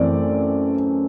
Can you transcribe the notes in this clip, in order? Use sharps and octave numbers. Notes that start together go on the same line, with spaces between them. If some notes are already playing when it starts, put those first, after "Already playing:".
Already playing: F#2 E3 A3 C4 D5